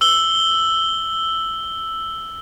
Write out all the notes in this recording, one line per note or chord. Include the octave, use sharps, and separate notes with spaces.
E6 F#7 G7